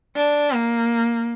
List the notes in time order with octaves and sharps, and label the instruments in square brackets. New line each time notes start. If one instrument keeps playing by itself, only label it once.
[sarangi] D4
A#3